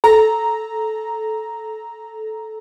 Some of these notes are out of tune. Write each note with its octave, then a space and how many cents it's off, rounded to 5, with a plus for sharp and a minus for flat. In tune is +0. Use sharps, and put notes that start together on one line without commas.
A4 -15 A#5 +0